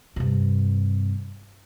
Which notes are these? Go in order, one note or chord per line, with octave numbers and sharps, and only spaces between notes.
G2 C3